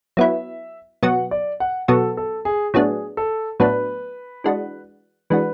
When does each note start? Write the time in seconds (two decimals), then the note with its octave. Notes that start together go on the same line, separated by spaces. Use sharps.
0.17 F#3 B3 E4 E5
1.03 B2 F#3 B3 F#4 F#5
1.31 D5
1.60 F#5
1.88 B2 F#3 B3 F#4 A4
2.17 A4
2.45 G#4
2.74 A2 F#3 B3 D4 G#4
3.17 A4
3.60 A2 F#3 B3 D4 B4
4.44 E3 G#3 D4 F#4
5.30 E3 G#3 D4 F#4 B4